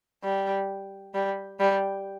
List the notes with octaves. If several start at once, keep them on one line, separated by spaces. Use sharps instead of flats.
G3
G3
G3